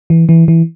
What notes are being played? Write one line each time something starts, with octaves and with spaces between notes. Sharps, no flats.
E3
E3
E3